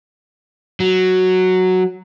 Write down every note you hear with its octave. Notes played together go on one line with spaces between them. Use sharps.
F#3